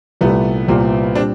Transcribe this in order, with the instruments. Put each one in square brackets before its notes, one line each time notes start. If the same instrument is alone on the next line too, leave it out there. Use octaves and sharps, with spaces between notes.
[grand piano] C2 A#2 G3 [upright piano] A3 B3
[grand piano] C2 A#2 G3 [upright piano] A#3 C4
[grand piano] A#2 G3 [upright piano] C4 D4